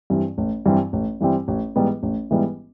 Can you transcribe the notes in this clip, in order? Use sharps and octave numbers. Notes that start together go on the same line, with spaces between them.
G2 E3 G3 C4
A1
G2 E3 G3 C4
A1
G2 E3 G3 C4
A1
G#2 E3 G3 B3
A1
G#2 E3 G3 B3